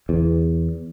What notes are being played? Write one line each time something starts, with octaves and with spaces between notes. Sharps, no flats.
E2